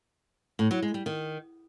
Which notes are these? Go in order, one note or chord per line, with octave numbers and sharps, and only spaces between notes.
A2
F#3
G#3
G3
D#3